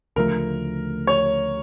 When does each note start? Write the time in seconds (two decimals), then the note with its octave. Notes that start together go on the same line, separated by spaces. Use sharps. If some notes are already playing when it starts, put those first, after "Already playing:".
0.16 D2 C#3 F3 A3 A#4
1.07 C#5